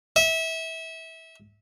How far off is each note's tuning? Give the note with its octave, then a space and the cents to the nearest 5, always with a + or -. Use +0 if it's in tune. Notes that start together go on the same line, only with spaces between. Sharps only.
E5 -25